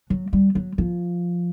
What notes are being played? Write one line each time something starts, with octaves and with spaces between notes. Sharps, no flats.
F#3
G3
F#3
F3